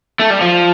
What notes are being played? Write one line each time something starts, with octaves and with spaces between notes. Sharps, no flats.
A3
G3
F3